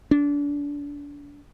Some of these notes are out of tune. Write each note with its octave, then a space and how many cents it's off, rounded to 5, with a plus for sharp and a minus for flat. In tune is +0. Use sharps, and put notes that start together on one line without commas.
D4 -30